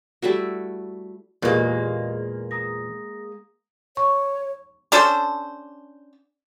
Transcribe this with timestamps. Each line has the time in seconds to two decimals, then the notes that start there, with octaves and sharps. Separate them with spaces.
0.22 G3 A3 E4 F#4
1.42 E2 A#2 G#3 A#3 G4 G#4 D#5
2.51 A#5 D#6 A#6
3.97 C#5 C#6
4.92 C#4 D4 A4 C5